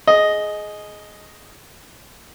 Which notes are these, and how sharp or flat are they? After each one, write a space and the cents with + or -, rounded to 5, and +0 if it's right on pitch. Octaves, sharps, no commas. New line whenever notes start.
G#4 +20 D#5 +0